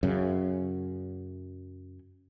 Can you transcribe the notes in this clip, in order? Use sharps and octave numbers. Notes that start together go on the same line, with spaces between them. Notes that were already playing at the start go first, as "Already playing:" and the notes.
F#2 C#3